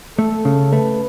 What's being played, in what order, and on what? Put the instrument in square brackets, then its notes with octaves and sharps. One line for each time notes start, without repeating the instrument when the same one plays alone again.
[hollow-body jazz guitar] A3 [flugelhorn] A4
[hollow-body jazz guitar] C#3
[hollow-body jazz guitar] A3 [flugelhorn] B4